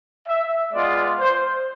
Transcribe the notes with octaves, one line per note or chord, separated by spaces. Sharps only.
E5
G#3 B3 F4 D5
C5